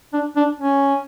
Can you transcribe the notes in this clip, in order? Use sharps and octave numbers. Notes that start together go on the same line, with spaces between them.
D4
D4
C#4